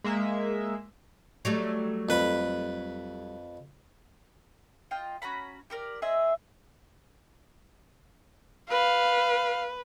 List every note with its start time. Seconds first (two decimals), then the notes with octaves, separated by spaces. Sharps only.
0.04 G#3 A#3 E5
1.45 F#3 G3 A3
2.09 F2 B4 B5
4.91 F4 D#5 G5
5.22 C#4 F#4 A#5 B5
5.70 G4 A4 A#4 D5
6.02 C4 G#4 D#5 E5
8.70 B4 F5